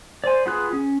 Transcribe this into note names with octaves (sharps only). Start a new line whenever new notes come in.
C5 D5 G#5
B3 F4 G#4 F#6
C#4